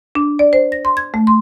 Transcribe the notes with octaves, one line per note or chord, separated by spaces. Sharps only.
D4
D5
C5
A#6
C6
G#6
A3
C6